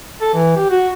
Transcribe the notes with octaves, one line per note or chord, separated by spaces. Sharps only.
A4
E3
G4
F#4